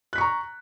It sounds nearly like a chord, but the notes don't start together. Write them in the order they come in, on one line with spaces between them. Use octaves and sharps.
F#6 B6 C#6 A#5